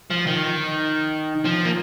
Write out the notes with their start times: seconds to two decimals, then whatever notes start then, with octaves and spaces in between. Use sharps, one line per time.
0.10 F3
0.27 D#3
1.45 F3
1.65 A#3